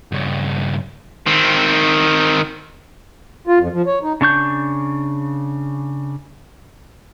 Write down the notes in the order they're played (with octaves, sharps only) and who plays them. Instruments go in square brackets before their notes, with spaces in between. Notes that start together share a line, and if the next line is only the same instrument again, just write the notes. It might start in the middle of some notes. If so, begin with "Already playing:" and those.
[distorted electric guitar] G2 C#3
D#3 C4
[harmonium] F4
F2
F3
C#5
D#4
[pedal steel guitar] C#3 D4 C#6 G6